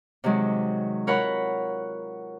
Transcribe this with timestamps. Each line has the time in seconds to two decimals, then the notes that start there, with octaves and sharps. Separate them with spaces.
0.24 C3 D#3 F#3 G#3
1.07 F4 A#4 C#5 F#5 B5